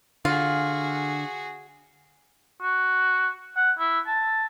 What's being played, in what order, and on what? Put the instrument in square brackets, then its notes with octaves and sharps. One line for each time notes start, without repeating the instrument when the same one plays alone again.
[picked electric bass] D3 [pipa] F4 [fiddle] F#4 G#4
[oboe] F#4
F#5
E4
A5